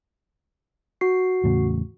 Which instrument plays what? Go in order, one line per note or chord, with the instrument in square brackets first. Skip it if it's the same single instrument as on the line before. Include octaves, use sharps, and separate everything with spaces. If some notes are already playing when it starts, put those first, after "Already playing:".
[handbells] F#4 C7
[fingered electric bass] E2 A2 C#3